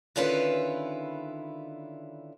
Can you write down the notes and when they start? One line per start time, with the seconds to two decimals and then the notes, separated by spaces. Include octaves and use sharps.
0.16 D3 D#3 C#4 E4 F4 B4